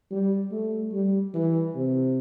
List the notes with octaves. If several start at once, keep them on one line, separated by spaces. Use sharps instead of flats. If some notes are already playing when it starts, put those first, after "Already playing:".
G3
A3
G3
E3
C3